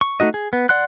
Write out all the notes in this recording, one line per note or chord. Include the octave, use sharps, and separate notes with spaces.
C#6
A3 D#4 F#4 D#5
G#4
B3
D5 F#5 C6 F#6